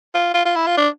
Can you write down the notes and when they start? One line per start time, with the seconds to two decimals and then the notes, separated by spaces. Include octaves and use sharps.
0.14 F4
0.34 F4
0.45 F4
0.56 E4
0.67 F4
0.77 D4